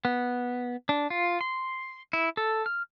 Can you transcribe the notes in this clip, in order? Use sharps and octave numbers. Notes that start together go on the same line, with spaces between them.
B3
D4
F4
C6
E4
A4
F6